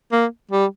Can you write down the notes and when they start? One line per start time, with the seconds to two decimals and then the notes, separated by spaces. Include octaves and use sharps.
0.12 A#3
0.51 G3